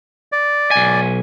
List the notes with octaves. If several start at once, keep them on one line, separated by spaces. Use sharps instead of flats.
D5
B1 G#5